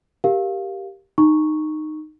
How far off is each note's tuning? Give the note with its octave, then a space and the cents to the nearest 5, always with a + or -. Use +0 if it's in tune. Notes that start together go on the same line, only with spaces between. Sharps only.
G4 +0 A#4 +0 F5 +0
D#4 -15 A#5 +0 C#6 -5